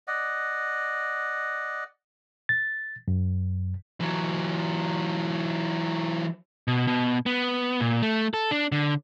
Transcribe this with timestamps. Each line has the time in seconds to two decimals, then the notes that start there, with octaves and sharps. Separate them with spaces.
0.07 D5 D#5 F#5
2.49 A6
3.08 F#2
4.00 E3 F#3
6.68 B2
6.87 B2
7.26 B3
7.81 A#2
8.02 A3
8.34 A4
8.51 D4
8.72 D3